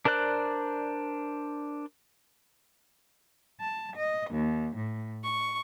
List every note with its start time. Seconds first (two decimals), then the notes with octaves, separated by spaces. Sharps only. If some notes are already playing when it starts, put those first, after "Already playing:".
0.05 D4 A#4 C5 D5 F#6
3.60 A5
3.95 D#5
4.30 D#2
4.75 A2
5.23 C#6